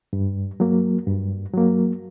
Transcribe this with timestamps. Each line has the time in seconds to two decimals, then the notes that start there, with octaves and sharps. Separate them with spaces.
0.13 G2
0.60 F#3 A#3
1.07 G2
1.54 F#3 A#3